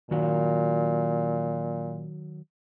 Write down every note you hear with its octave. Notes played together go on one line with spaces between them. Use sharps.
A#2 D#3 F#3 F#4